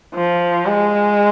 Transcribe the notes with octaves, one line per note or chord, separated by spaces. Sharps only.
F3
G#3